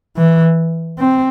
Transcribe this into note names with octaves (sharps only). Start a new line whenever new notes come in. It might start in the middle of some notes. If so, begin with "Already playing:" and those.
E3
C4